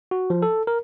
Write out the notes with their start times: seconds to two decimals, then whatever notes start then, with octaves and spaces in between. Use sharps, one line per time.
0.11 F#4
0.30 F3
0.42 A4
0.67 A#4